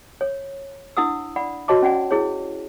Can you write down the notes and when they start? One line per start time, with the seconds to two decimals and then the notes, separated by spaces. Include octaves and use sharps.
0.21 C#5
0.97 D4 E4 F#5 D#6 E6
1.36 D5 F#5 B5
1.68 F#4 C#5 D#5 A5 C6 D6
1.82 C#4 D5 F#5 G#5
2.11 E4 G#4 C#5